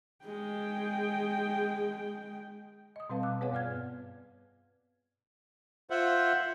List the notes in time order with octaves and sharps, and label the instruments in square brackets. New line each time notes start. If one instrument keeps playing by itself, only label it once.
[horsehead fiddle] G#3 G5
[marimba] D#5 D#6
B2 G3 C4 B4 F5 A5
D6 E6 F#6
B3 G#4 B4 C#5 F5 F#5
G2 D5 F6 G#6
[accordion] F4 C5 E5 F#5